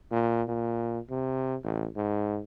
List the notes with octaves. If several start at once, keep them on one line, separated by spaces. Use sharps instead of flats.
A#2
A#2
C3
A1
G#2